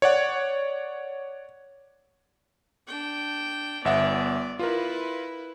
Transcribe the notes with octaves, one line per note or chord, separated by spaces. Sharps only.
C#5 D5 F#5
D4 G5
G1 B3 D5 E5 F#5
E4 F4 A#4 B4